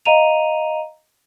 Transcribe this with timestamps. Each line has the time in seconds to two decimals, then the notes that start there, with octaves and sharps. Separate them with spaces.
0.05 D#5 F5 A#5 D#7 F7